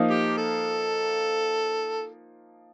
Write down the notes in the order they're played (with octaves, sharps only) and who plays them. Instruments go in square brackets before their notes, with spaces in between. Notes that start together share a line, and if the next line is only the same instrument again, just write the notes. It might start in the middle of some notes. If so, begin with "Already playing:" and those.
Already playing: [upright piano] F3 A#3 D#4
[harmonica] G4
A4